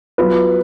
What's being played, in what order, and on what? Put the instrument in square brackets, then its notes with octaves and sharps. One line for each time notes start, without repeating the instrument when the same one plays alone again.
[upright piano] F#3 B3 F4 [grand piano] B4